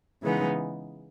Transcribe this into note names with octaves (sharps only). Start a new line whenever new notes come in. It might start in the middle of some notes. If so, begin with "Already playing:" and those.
C#3 E3 G#3 B3 D#4